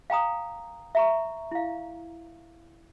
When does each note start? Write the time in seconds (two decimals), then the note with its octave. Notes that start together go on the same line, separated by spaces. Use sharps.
0.10 F5 G5 A#5 D#6
0.95 E5 A#5 C#6
1.51 E4 F5